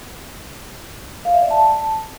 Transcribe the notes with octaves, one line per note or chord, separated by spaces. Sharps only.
F5
E5
D5
A5